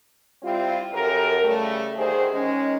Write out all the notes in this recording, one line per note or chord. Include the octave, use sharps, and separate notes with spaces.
G3 C4 E4 F4
F#2 G4 A4 A#4
C#3 G3 A3
D3 D#3 G4 G#4 C5
D#3 G#3 C#4